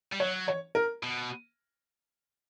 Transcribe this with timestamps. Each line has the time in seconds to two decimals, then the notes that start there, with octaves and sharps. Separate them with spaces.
0.12 G3
0.20 F#3 C#5
0.48 C#5
0.75 A#4
1.03 B2